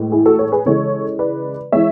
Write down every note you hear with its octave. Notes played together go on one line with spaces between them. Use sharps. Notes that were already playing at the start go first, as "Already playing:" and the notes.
Already playing: A2 E3 G#3
E4 G#4
F#4 A4
A4 C#5
G#4 B4
C#3 E3 G#3 A4 C#5
B4 D5
E3 G#3 C#5 E5